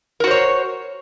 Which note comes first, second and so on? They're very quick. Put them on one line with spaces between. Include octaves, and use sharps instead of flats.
A#4 F#4 C5 C#5